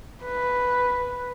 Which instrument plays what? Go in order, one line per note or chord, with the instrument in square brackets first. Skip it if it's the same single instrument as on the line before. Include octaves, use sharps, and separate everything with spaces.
[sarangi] B4